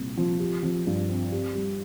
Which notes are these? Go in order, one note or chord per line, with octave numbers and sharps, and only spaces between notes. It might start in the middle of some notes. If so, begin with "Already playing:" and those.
Already playing: C2 A#2 C4
F3
G4
F3
G2
C4
G4
G3